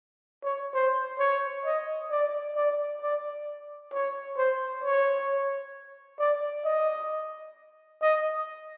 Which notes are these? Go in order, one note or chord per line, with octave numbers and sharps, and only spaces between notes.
C#5
C5
C#5
D#5
D5
D5
D5
C#5
C5
C#5
D5
D#5
D#5